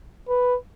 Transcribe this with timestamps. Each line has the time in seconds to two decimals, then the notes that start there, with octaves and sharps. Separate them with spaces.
0.28 B4